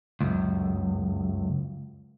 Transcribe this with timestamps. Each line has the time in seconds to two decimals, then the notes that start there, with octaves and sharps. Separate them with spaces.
0.20 C#2 F#2